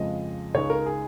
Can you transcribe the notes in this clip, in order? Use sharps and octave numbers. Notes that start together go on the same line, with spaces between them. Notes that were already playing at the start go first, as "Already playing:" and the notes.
Already playing: F2 C#3 F3 G#3 D#5
C#2 C#3 G#3 D#4 C#5
A#4
G#4